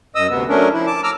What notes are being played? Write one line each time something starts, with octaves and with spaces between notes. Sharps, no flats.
F#2 D#5 D#6 E6
D2 C3 B3
F#3 A3 C#4 D4 A#4
F3 E4
A5 D6
A#5 D6 E6 F6